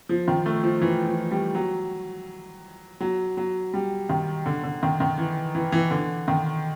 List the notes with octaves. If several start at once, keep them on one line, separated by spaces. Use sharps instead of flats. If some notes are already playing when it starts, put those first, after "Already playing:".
F3
D#3
A3
F3
E3
F3
G3
F#3
F#3
F#3
G3
D#3
D3
D3
D#3
D#3
E3
E3
E3
D3
D#3